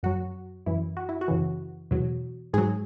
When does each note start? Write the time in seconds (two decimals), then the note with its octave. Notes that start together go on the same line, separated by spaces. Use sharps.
0.03 F#2 F#3 F#4
0.66 F#2 E3 E4
0.97 F#4
1.09 E4
1.21 F#4
1.28 F#2 C#3 E3
1.91 E2 B2 F#3
2.53 G#2 F#3 G#4